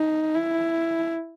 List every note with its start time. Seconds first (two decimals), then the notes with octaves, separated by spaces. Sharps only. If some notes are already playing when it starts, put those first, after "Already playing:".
Already playing: D#4
0.35 E4